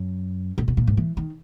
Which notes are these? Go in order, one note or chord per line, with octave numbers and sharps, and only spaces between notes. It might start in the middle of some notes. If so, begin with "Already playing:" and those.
Already playing: F#2
A#2
B2
A#2
G#2
E3
D#3